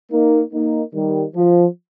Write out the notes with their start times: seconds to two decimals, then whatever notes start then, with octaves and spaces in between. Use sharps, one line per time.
0.11 A#3 D#4
0.52 A#3 D#4
0.94 D#3 G3
1.35 F3